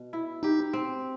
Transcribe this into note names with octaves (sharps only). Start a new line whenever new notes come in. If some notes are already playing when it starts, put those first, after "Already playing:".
Already playing: B2
E4
D#4 G4
C4